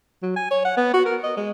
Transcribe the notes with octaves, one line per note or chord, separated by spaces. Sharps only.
F#3
G#5
C#5
F#5
B3
F#4
A#4
D#5
G#3